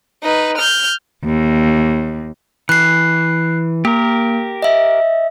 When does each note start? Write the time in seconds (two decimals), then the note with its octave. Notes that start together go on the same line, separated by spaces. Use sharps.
0.23 D#4 B4
0.57 F6 G6
1.24 D#2
2.69 E3 F#6 C7
3.85 A#3 G4 A#4
4.62 D#5 E5